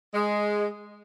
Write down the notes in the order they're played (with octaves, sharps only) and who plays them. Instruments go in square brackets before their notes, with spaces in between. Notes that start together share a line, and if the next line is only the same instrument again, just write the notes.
[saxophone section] G#3